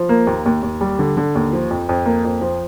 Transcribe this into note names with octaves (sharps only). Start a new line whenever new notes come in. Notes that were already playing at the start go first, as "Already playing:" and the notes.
Already playing: F3
A#3
D#2
D#2
D#2
G3
D3
D3
D#2
F3
F2
F2
A#3
F2
F3